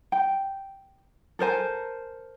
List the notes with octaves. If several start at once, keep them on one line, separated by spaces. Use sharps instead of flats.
G5
A4 A#4 C5 G#5